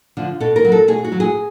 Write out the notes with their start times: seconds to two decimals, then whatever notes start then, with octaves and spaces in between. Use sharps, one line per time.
0.17 D3 F3
0.40 B2 A4
0.56 A#4
0.65 F#3
0.72 A4
0.88 B2 G#4
1.04 F#4
1.12 F#3
1.20 G#4